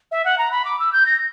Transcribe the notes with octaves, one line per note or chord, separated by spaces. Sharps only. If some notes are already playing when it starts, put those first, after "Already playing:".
E5
F#5
A#5
B5
D6
E6
G6
A#6